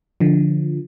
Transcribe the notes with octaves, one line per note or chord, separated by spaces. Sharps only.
D3 F3